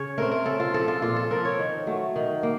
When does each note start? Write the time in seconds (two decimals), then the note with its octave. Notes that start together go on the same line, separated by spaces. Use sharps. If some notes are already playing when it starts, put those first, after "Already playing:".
Already playing: C#3 C#4 C#5
0.18 A3 C4 A#4
0.31 A#4
0.45 C#3 A4
0.60 F4
0.74 F3 C4 A4
0.88 F4
1.02 A#2 F4
1.16 A4
1.31 F3 C4 A#4
1.45 C#5
1.59 D#3
1.87 F#3 A3
2.16 D#3
2.43 A#3